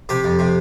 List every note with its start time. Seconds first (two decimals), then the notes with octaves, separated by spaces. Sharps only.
0.09 C3 G4
0.24 F2
0.39 C3